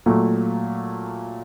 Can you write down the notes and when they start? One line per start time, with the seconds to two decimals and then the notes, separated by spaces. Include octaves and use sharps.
0.06 A#2 F#3 A3